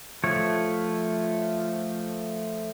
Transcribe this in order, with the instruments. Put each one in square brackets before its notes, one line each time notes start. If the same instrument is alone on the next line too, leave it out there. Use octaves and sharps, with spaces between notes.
[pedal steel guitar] F3 A3 C#5